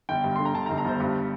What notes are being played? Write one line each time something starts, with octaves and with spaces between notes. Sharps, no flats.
G1 G5
G2
D3 C6
A#5
D3 A5
A#5
G1
A#5
G1 C5
G2 G4